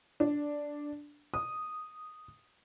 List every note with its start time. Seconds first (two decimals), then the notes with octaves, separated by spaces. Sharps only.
0.20 D4
1.34 D#6